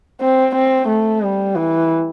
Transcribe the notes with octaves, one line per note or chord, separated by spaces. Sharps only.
C4
C4
A3
G3
E3